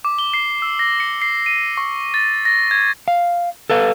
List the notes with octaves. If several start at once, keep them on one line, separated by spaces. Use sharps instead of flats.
D6
G7
C7
E6
A#6
C#7
C7
D#7
C#6
A6
A#6
G#6
F5
A4 B4 F5